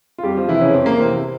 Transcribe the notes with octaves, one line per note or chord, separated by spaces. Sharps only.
F4
F2 G3 G4
F3 F4
C3 E3 E4
C#3 C#4
F2 C4
A#3
C3 E3 C4